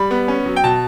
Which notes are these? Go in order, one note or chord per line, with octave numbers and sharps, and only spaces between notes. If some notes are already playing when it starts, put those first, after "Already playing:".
Already playing: G3 B5
B3
C#4
F#3
G5
B2 A5